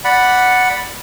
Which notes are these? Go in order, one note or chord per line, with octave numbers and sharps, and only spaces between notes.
D5 F#5 B5